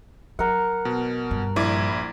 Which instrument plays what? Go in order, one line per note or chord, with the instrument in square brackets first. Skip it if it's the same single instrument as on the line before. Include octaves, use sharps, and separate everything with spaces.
[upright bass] F#3 [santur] A#4 F#5
[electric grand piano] B2
[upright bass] G2
[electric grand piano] A#1 E4 G#6 [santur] D5